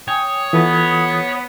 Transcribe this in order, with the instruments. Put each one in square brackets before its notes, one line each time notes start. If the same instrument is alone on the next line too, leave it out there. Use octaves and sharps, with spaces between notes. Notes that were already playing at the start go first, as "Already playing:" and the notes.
[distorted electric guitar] C#5 [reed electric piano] G5 G#5 [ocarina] D#6
[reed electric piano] E3 F4 A4 [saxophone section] B3